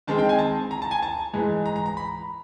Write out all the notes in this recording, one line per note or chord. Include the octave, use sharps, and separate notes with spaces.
D#3 G#3 C4 D#4 A5
G5
G#5
A5
A#5
A5
G#5
A5
G#2 E3 G#3
A#5
A#5
A#5
B5